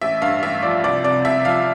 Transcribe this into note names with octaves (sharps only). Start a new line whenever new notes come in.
A1 E5
G2 F5
A1 E5
F3 D5
C2 D5
C3 D5
C2 E5
F3 F5